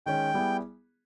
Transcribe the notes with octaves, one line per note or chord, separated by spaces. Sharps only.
D#3 G#3 C#4 G5
G3 B3 E4 G#4